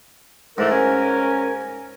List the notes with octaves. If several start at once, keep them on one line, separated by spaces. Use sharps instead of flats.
G#2 E3 A3 D4 A#4
C#4 G#5